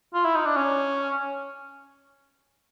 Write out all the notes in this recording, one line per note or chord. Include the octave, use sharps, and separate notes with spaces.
F4
E4
D#4
D4
C#4